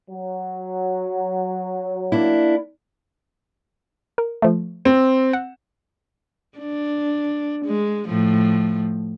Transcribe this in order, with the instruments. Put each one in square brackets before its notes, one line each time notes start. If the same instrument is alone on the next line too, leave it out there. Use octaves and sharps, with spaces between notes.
[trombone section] F#3
[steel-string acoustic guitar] A#3 D4 E4
[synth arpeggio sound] A#4
F3 A3
[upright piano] C4
[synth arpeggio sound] F#5
[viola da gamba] D4
G#3
A2 F3